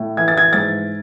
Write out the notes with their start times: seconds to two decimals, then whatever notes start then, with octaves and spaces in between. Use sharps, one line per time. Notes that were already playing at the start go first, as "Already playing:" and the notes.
Already playing: A2
0.17 E3 G#6
0.28 A6
0.37 G#6
0.53 G#2 A6